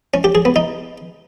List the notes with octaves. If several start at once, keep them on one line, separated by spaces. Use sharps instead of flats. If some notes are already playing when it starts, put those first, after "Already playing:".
C#4
G4
G#4
B3
D#4